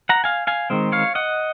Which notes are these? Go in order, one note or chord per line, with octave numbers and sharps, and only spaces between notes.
F#5 A#5
F5 G#5
F5 G#5
D#3 G#3 C4
C#5 F5
D#5 F#5